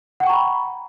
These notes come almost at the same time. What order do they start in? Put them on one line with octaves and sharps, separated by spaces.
F#5 G5 C#6 A#5 B5